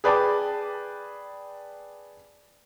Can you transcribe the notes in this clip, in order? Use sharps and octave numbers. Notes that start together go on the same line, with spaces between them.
G#4 B4 D5 G5 A5 D6